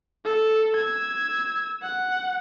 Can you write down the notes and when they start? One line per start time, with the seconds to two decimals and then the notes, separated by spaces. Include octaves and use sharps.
0.25 A4
0.76 E6 G#6
1.82 F#5